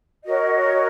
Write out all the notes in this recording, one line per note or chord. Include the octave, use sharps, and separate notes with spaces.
F#4 A#4 C#5 D#5